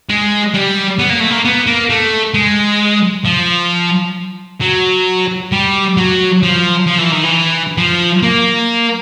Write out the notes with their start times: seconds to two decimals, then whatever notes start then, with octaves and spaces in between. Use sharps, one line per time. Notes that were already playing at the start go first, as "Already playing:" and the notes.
0.09 G#3
0.54 G3
0.99 B3
1.09 A#3
1.20 A3
1.30 A#3
1.45 B3
1.67 A#3
1.90 A3
2.34 G#3
3.25 F3
4.61 F#3
5.52 G3
5.97 F#3
6.43 F3
6.87 F3
6.99 E3
7.12 D#3
7.23 E3
7.78 F3
8.23 A#3